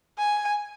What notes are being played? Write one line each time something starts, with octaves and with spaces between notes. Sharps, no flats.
G#5